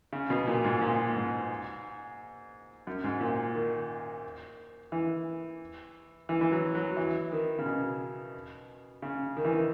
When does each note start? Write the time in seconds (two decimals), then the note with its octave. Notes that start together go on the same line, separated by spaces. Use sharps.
0.13 C#3
0.30 B2
0.47 A#2
0.64 G#2
0.81 A#2
1.16 G#2
2.87 F#2
3.04 G#2
3.20 A#2
3.55 D#3
4.92 E3
6.29 E3
6.41 E3
6.52 F#3
6.75 F#3
6.97 E3
7.32 D#3
7.59 C#3
7.66 B2
9.02 C#3
9.37 D#3
9.45 E3
9.52 D#3